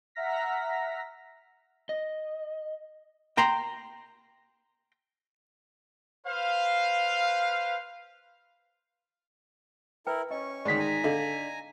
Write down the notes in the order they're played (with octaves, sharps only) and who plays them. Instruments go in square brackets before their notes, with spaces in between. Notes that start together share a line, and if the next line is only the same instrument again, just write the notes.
[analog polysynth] E5 F#5 A#5 F6 A#6 B6
[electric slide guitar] D#5
[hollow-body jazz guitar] G5 A#5 C6
[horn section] B4 C5 F5
[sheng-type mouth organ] E4 A#4 [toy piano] B4 G5
[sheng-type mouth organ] C#4 C#6 [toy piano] D#5
[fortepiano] G#2 D#3 [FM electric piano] D5 B6
[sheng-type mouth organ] G#5 A#5
[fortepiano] D3 [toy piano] D#5 F5